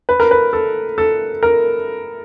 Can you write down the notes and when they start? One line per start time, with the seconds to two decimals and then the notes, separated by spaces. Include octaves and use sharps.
0.09 B4
0.20 A#4
0.31 B4
0.53 A4
0.98 A4
1.43 A#4